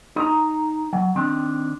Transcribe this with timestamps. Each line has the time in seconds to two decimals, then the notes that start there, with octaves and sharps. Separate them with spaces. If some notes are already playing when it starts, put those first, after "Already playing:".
0.16 D#4 A#5
0.93 F#3
1.15 D#3 C4 D4